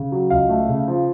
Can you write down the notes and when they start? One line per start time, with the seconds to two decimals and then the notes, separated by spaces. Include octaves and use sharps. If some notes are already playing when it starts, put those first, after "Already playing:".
Already playing: C#3
0.12 F#3
0.30 C#2 F5
0.49 A3
0.69 C#3
0.88 F3